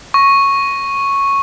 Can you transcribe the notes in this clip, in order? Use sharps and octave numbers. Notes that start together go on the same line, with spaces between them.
C#6